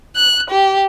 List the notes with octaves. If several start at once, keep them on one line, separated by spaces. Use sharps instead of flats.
F#6
G4